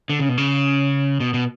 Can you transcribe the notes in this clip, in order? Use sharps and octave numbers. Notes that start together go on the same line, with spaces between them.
D3
C#3
B2
C#3
B2
B2